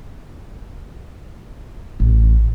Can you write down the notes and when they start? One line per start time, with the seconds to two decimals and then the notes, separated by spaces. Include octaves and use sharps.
2.00 A1